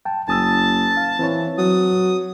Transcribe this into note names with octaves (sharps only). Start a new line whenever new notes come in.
G5 A5
F#1 G#5 A5 D#6 E6
F5
E3 C4 B4 C#5
F#3 D#6